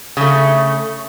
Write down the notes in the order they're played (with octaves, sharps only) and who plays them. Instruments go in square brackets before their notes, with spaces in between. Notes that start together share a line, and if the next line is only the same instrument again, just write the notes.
[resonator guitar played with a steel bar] C#3 A3